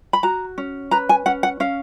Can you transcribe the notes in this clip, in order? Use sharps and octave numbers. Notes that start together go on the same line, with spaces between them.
B5
F#4 A#5
C#4
B4 A#5
G#5
C#4 F#5
F#5
C#4 F5